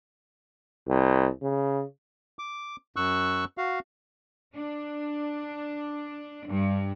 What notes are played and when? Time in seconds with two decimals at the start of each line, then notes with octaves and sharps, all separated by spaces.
0.88 C2
1.42 C#3
2.39 D6
2.96 F#2 C#6 E6 F#6
3.58 F#4 F5
4.55 D4
6.48 G2